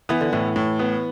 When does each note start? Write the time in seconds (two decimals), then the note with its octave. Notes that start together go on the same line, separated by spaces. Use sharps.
0.09 E3 B3
0.21 D3
0.33 A2 E3
0.56 A2
0.79 B3